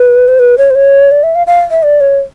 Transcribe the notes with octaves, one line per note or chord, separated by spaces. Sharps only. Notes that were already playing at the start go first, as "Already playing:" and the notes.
Already playing: B4
C5
B4
C#5
C5
C#5
D5
E5
F5
F5
E5
D5
C#5